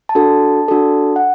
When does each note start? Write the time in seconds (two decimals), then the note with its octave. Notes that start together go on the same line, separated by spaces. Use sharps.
0.09 A5
0.15 D4 F#4 A4
0.68 D4 F#4 A4
1.16 F#5